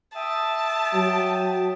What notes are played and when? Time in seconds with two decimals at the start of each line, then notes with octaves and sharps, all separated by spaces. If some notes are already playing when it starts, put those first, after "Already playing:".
0.16 E5 G5 A5 D#6
0.93 F#3